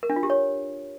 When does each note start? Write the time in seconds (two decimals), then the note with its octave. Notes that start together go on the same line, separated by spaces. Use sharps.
0.03 A#4
0.10 D4
0.16 F4
0.23 G4
0.30 C#5